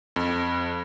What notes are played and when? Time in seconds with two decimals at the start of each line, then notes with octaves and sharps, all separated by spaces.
0.16 F2